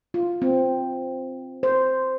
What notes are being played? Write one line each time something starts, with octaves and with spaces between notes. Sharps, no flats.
F4
C4
C5